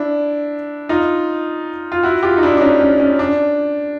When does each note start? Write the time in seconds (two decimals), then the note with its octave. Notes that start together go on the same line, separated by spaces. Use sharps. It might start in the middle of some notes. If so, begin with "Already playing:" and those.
Already playing: D4 E4
0.89 D#4 F4
1.92 F4
2.03 E4 F#4
2.23 F4 G4
2.37 D#4
2.43 D4 E4
2.57 D4
2.61 C#4 D#4
2.81 C#4
3.00 C#4
3.19 D4